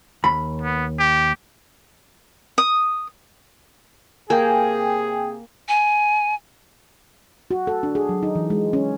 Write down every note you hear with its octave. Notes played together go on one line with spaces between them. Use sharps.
D#2 B5
B3
G4
D#6
C3 A#3 G#4 G5 G#5
G#5
F#4
A4
D4
G#4
F#3
D#4
E3
G#3
C#4